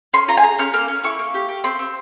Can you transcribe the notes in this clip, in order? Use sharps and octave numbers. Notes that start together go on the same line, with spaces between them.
C#4 C6
F4 A#5
G#5
G#4 A#5
C#4 F6
A#3 F6
C#4
E4 C#6
A#3
G4
G4
C4 C6
C4